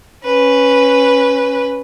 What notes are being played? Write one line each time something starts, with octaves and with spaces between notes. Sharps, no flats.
C#4 B4